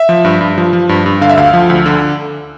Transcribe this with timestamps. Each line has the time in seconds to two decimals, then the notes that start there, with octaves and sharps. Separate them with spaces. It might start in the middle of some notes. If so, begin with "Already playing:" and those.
Already playing: E5
0.09 F3
0.25 G2
0.41 G2
0.58 F3
0.73 F3
0.89 G2
1.06 G2
1.21 D3 F5
1.30 E5
1.37 D2 F5
1.53 F3
1.70 D2
1.86 D3